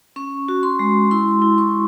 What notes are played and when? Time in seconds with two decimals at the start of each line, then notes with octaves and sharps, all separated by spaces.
0.16 C#4 C#6
0.48 F#4
0.63 C6
0.79 G#3
1.11 E4 C6
1.42 E4
1.58 C#6